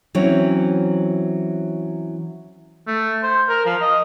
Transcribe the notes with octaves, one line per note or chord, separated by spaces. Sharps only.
E3 F#3 C4 C#4
A3
C5
A#4
F3
D#5